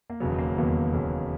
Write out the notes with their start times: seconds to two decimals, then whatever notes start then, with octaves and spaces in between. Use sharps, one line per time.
0.10 A#3
0.20 E1 D#2 C#3 F#3 B3
0.38 A#3
0.57 E1 D#2 C#3 F#3 B3
0.93 E1 D#2 C#3 F#3